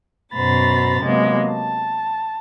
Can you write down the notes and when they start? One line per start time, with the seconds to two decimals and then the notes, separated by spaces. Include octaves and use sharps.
0.34 F#2 B2 C5 A#5 B5 A6
1.02 C3 F#3 G#3 A#3 B3
1.51 A5